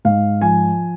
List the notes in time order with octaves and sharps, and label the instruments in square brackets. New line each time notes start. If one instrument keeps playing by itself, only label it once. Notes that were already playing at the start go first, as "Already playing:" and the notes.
[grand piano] G#2 F5
F3 G#5